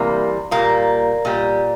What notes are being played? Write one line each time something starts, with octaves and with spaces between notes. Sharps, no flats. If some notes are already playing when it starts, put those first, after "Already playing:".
Already playing: C3 E3 G3 A#3
A#2 G3 A#3
A#2 G3